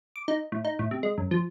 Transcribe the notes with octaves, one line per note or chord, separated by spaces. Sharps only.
D6
D#4
A2
D#4
A2
C3
G#3
F#2
F3